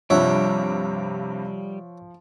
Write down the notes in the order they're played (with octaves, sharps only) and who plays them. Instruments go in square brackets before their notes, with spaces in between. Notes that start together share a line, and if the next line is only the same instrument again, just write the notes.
[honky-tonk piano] G2 C3 [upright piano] F3 [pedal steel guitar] G3 [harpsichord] C#5 E5 F#5